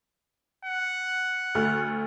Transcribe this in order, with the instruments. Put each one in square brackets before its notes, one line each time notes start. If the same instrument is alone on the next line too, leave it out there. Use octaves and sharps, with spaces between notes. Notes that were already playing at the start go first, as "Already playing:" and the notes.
[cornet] F#5
[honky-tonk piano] D2 A3 F6